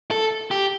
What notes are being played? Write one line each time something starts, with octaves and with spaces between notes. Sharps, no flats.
A4
G4